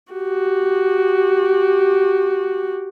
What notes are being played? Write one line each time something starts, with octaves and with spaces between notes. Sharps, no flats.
F#4 G4